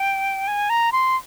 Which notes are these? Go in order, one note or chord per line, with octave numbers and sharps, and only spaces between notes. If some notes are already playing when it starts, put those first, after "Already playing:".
Already playing: G5
G#5
A#5
C6